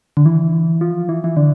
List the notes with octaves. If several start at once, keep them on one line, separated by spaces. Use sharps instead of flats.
D3
E3
F3
E3
E3
D3